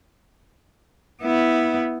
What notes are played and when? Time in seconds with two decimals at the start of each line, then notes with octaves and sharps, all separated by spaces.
1.22 B3 E4